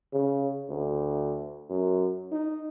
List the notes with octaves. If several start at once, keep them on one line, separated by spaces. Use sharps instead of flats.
C#3
D2
F#2
D#4